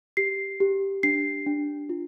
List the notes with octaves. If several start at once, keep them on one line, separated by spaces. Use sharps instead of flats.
G4 C7
G4
D4 C7
D4
F4